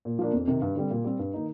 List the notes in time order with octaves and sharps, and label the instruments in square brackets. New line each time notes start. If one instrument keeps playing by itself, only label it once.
[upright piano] A#2
F3 A#3 D4
F2
C3 D#3
G2
D3 G3 C4
A#2
G3 C4
G2
D#3 A#3 D#4